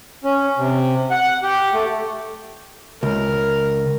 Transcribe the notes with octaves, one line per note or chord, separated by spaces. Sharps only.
C#4
C3
F#5
G4
A3
C#2 A#4